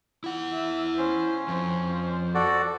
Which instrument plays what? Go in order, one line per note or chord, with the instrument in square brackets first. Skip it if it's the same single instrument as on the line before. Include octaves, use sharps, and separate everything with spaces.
[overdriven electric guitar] E4 F#5
[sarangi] E5
[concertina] C#4 [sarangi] C5
[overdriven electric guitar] F2 [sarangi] C5
[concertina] F#4 A4 D5